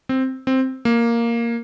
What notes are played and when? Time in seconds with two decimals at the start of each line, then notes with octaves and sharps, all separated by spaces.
0.09 C4
0.47 C4
0.85 A#3